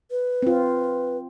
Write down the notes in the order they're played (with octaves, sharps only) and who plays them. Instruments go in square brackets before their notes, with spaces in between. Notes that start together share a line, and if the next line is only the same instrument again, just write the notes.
[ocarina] B4
[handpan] C4 F4